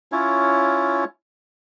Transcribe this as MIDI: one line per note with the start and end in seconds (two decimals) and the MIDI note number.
0.12 1.04 61
0.12 1.04 64
0.12 1.04 65
0.12 1.04 73